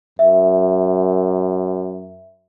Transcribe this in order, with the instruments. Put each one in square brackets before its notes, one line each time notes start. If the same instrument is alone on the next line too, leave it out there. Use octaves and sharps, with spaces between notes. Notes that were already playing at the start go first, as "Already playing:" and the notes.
[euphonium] F#2 [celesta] E5